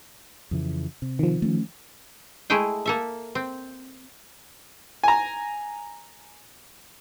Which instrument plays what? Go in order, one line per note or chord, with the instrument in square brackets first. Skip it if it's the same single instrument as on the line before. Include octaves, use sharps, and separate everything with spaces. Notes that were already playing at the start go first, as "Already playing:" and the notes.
[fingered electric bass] F2 C#3 E3
C3
[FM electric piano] D#3 F3
[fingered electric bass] A3 C#4
[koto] G#3 A3 E4 G#4 G5
A#3 A4 E5
C4
[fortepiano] G#5 A#5